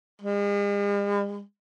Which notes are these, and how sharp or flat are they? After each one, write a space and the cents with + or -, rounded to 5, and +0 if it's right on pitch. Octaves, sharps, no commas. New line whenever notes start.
G#3 -45